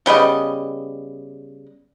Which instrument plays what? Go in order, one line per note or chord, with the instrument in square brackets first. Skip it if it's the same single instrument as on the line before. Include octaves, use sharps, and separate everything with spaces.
[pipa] C#3 G3 B3 D#5